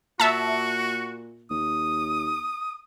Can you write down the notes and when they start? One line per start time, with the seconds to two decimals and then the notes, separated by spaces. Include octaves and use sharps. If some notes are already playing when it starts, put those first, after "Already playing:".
0.20 A#2 F#4 E5 A5
1.51 D#2 D#6